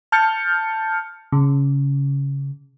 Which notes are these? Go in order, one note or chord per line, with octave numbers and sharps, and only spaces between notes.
A5 F6 G6 A6 C#7
C#3